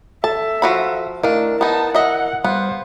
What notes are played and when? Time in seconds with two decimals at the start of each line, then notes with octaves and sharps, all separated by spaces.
0.24 A4 E5 A5
0.62 F3 F#4 B5
1.23 D#3 A3 D4 E4 A#4 F5
1.61 B3 D#4 A5
1.95 D#5 E5 F#5
2.44 G3 B3 C5 F5 F#6